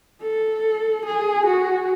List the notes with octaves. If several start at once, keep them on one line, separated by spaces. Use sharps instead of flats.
A4
G#4
F#4